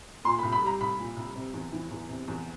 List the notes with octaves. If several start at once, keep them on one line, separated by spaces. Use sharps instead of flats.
A#2 C6
B5
C2
B5
G3 A#5
C2 B5
A#2
C2
C3
E2
E3
E2
C3
E2